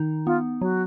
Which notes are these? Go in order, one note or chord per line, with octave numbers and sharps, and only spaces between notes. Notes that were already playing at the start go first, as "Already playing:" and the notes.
Already playing: D#3 D#4
B3 F4
F#3 F#4